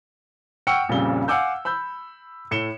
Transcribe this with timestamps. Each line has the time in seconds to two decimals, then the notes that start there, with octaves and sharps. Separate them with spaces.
0.67 F#5 G5 C#6 E6 F6 C#7
0.89 A#1 F2 A#2 C#3 G3 G7
1.28 F5 F#5 G#5 D6 E6 G6
1.65 B5 E6 G6
2.51 A2 C#7 E7 G7